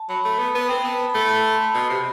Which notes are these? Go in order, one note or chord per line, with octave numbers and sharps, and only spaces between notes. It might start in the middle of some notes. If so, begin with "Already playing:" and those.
Already playing: A5
F#3 B5
A3 B5
B3
B3
C4
G5
B3 A5
B5
A3 A5
A5
A5
C6
A5
B5
B2
C3